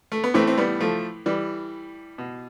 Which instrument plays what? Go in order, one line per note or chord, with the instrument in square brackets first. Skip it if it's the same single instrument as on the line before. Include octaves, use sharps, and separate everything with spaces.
[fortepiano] A3
B3
A2 E3 A3 C4
C4
G3 B3
F3 A3
E3 G3
B2